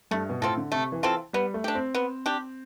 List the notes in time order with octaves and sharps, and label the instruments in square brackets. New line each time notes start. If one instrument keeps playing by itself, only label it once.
[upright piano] G2 [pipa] A3
[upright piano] B2
[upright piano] A2 [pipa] C4 F4 A4
[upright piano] D3
[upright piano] C3 [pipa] A3
[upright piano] E3
[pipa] C4 F4 A4
[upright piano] G3 [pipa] B3
[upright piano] A3
[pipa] D4 G4
[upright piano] C4
[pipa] B3
D4 G4